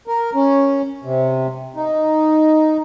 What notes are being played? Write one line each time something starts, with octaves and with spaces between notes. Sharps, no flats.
A#4
C#4
C3
D#4